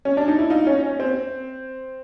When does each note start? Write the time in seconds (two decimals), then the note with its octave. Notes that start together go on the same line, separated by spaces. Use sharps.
0.05 C#4
0.17 D4
0.28 D#4
0.39 E4
0.50 D#4 F4
0.67 C#4
0.83 C#4
1.00 C4